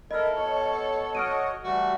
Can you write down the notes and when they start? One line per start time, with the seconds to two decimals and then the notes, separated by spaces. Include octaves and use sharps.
0.11 E4 A4 A#4 D#5 F6
0.35 B2 C#5
1.15 F#4 C#5 D#5 F6 D7 D#7
1.64 E3 G3 A3 F#4